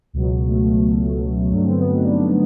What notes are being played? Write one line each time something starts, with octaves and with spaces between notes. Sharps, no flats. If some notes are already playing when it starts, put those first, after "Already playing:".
C#2 B2 F#3
A3
G2 D3 F#3 A3
C4
B3
B3
C4
D#4
D4
D4